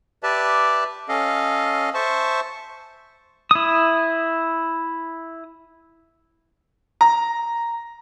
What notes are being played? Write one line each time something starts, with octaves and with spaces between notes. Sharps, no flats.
G4 B4 D5 E5 A5
C#4 A4 D#5 F5
C5 E5 A5 C#6
E4 D#6
A#5